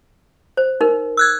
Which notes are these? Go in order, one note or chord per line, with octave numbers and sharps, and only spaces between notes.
C5
D#4 A#4
E6 F#6 G#6